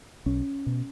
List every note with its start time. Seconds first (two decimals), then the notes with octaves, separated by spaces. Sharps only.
0.26 B1 C#4
0.66 B2